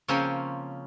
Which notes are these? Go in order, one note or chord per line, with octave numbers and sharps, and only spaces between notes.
C#3 F3 A#3 C4 C#4